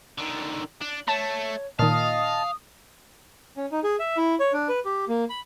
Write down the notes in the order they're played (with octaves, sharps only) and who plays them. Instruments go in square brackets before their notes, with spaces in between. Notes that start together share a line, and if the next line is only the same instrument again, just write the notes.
[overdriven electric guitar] D3 D#3
D4
[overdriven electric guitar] A3 [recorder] C#5 [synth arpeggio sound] A5 E7
[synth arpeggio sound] A#2 D#3 [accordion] D#5 A5 [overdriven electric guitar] F5 [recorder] D#6
[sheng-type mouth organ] C#4
D#4
G#4
E5
E4
C#5
D4
B4
G4
A#3
B5